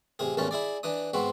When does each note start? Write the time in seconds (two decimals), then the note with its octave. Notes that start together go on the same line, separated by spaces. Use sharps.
0.19 A1 C3 G#4
0.37 A1 E2 A#2 E3 C#4 A5
0.51 E4 G#4 D5
0.83 E3 D4 D#6
1.14 G#2 B3 C4 F#4